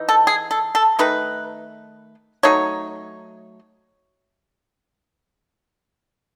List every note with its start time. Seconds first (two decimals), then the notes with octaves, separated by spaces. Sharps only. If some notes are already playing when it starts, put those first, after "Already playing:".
Already playing: E3 D#4
0.09 A4
0.27 G#4
0.51 A4
0.75 A4
0.99 D#3 A3 D#4 B4
2.43 F#3 A3 D#4 C#5